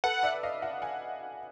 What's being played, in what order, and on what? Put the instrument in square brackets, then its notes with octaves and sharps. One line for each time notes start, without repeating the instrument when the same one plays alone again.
[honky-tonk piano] A4 B4 [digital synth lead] F#5
[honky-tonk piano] D5 E5
D#5 F5
E5 F#5
F#5 G#5